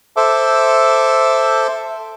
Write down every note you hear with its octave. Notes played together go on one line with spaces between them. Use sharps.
A4 C5 E5 D6